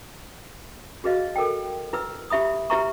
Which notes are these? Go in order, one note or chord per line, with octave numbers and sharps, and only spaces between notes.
F#4 G#4 B4 D#5 F5
A4 A#4 C5 G5
E4 B4 E6
E4 G4 E5 B5 D#6
E4 G4 B4 E5 A#5 C#6